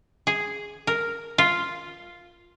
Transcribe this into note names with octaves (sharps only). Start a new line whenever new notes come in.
G#4
A#4
F4